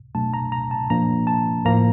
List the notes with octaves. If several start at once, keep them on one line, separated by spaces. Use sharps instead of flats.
B2 F#3 A3 D4 A5
A#5
A#5
A5
A#2 F3 A#3 D4 A#5
A5
A2 F3 A#3 A#5